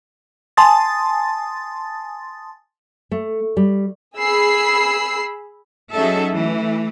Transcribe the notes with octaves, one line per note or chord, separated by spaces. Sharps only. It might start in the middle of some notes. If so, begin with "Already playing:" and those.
G#5 A5 C6 D#6 A6
A3
G3
G#4 B5 E6 C7
F#3 C#4 D#4 G#4 A4 E5
E3 A3